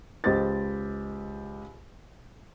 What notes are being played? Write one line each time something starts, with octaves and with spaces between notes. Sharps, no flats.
C#2 G4 C5 D#5 A6